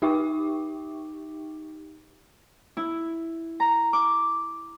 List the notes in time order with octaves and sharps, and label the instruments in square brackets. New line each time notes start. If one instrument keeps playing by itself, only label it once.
[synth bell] D#4 G4 E5 G5 C#6 D6
[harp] E4
A#5
D6